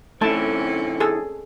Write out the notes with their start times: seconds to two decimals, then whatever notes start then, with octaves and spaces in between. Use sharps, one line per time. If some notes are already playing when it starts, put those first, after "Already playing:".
0.21 D3 E3 A3 C4 C#4 A5
1.00 G#4 A4